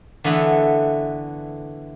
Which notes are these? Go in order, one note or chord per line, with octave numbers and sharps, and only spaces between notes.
D3 E3 A3 B3 B5